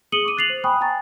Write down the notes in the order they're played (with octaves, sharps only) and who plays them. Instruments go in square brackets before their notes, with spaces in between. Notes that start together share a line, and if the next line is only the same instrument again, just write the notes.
[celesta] G#4 D#6 C#7 D#7 F#7 G7
C#6 D6 D#7
F#6 A6 C7 F7 F#7
C5
G5 G#5 B5 C#6 D#6 F#6
G5 G#5 A#5 C#6 A6